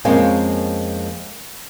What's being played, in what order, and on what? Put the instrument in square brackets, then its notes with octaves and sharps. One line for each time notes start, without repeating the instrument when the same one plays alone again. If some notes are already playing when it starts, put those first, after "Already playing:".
[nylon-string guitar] F2 G#3 A#3 C4 C#4